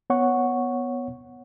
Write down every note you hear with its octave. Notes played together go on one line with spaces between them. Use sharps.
B3 C#5 F#5 C#6